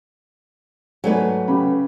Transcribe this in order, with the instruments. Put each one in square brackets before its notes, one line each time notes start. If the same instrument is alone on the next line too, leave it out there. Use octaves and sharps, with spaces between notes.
[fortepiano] G#2 D5 G#5 [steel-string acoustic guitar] F#3 A3 B4
[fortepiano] C#3 G4 B5